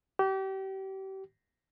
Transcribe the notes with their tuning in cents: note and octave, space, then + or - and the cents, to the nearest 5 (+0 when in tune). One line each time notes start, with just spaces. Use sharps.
G4 -35